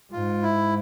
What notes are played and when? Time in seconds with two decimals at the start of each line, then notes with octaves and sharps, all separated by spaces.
0.12 G#2 F4
0.43 E4